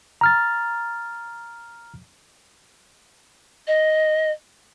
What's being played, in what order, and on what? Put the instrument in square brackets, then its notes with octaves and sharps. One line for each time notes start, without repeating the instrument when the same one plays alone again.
[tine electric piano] A#5 F6 A6
[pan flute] D#5